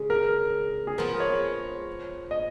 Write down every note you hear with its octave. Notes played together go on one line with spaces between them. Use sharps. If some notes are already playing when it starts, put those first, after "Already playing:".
Already playing: C#3 G#3 C#4
A#4
G#4
F3 B3 F4 A#4
C#5
D#5